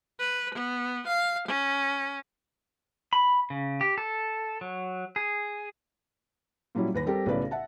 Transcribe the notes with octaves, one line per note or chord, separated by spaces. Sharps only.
B4
B3
F5
C#4
B5
C#3
G4
A4
F#3
G#4
A#2 F#3 G3 C#4 E4
D#2 B4 A#6
G3 C4 G4 A4 A#4
B1 A2 C#3 B4 D5
E5 F#5 A5